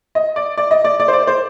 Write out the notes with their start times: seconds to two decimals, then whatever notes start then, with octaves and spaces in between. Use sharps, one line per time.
0.15 D#5
0.36 D5
0.58 D5
0.71 D#5
0.85 D5
1.00 D5
1.08 C5
1.13 D5
1.27 C5